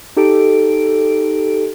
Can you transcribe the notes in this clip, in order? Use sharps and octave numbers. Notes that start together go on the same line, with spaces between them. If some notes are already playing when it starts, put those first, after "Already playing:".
D#4 G4 A4 D7